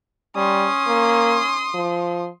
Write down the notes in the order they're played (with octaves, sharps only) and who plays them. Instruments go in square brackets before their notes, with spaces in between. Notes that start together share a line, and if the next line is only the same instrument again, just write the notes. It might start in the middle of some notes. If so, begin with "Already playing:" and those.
[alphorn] G3 [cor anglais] C#4 [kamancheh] C6 D#6
[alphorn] A#3
F3